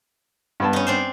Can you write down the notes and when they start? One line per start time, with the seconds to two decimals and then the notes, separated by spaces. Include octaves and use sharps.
0.60 G2 B3 A5
0.73 C#4 D#4
0.87 C4 D4 C5